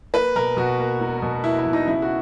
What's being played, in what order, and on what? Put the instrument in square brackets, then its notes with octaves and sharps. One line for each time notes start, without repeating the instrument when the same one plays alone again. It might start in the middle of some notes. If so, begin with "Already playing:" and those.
[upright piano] A#3 B4
B2 A#4
B2 F#4
A#3
E1
B2
A#3 E4
E4
B2
D#4
C#3 E4
F#4